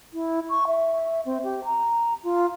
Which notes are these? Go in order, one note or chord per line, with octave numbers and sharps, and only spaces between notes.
E4
C#6
E5
C4
G4
A#5
F4